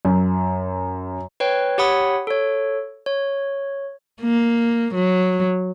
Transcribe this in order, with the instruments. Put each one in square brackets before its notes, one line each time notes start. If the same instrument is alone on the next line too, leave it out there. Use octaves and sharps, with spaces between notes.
[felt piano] F#2
[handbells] B4 C#5 G5
G4 C#5 F#5 B5 D#6
A4 C#5
C#5
[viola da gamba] A#3
F#3